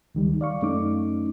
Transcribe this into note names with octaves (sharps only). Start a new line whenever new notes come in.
D2 D#3 G3
D5 F5 C#6
F#2 A3 C#4 D#4 D6